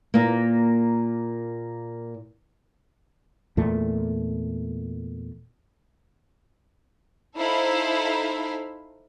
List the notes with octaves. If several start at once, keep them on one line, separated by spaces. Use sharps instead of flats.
A#2 A#3
E2 A#2 A3
D#4 E4 A4 C5 F5 B5